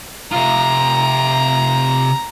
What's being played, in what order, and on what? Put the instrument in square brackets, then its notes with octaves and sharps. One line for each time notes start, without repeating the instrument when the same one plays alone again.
[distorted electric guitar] C3 F4 [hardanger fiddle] A#5